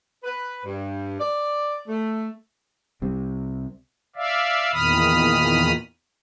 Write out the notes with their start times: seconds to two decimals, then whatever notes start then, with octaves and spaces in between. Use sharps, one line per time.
0.24 B4
0.65 G2
1.20 D5
1.88 A3
3.02 C2 C3 G3
4.16 D5 E5 F5
4.73 E2 A#2 D#3 B5 D#6 F6